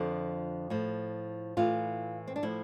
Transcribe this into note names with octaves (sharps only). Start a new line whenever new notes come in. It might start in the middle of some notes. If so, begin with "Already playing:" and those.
Already playing: F2 D3 F3
A2 F3
A2 E3 F4
C4
D4
A2 F3 E4